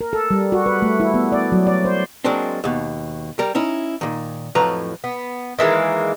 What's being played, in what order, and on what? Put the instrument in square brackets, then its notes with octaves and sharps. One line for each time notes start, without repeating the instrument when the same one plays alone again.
[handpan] A#4
A4
G3
F#4
B4
A3
E4
B3
D5
F#3
D5
C5
[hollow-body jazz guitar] F#3 G#3 A#3 C4 D4
D#2 B2
G3 A#4
C#4 D#4 E4
A#2 D#3
F2 A2 F3 F#3 B4 A#5
[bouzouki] B3
D#3 E3 G#3 A#3